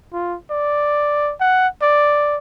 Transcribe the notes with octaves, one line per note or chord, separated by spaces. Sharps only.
F4
D5
F#5
D5